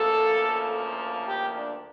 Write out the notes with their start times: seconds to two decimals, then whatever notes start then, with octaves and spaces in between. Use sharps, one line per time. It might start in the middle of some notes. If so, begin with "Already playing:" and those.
Already playing: D2 C#3 F3 A#3 A4
1.27 G4
1.55 D4